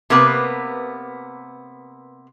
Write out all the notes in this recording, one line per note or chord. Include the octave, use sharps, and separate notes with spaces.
C3 A#3 B3 B4